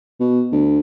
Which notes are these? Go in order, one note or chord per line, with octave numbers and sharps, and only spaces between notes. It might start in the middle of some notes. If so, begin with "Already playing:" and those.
B2
D2